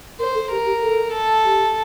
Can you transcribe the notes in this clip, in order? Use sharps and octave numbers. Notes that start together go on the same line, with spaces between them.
A#4 C5
A4
G4 A#4
G4
A4
A4
G4